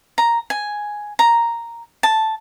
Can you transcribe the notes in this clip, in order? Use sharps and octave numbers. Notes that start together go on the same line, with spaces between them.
A#5
G#5
A#5
A5